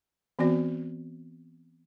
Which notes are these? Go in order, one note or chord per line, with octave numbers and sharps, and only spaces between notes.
E3 B3 C4 F#4 D5